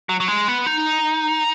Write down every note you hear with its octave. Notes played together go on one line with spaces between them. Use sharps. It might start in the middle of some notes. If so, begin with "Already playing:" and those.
F#3
F#3
G#3
B3
D#4